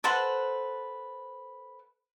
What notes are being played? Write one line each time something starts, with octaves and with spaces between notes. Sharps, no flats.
A4 B4 C5 F#5